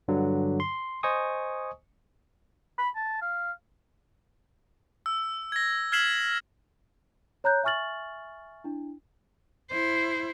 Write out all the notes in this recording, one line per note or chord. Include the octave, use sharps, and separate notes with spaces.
G2 D3 F#3
C6
C5 D#5 G#5 C#6 D#6
B5
A5
F5
E6
G#6 A#6
F6 G#6 B6 C7 E7 F#7
C#5 A#5 F#6 G6
E5 G#5 C#6 F6 A6 F#7
D4 E4
E4 C5